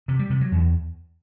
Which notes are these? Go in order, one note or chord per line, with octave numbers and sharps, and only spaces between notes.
C3
G3
C3
F#3
E2